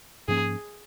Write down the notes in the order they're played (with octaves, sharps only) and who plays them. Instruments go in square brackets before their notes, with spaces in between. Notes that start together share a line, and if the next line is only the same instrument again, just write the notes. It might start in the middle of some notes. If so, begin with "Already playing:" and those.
[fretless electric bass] G#2 F3 A#3 C#4 [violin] G#4